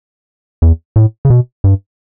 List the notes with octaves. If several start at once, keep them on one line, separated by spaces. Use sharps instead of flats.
E2
A2
C#3
B2
G2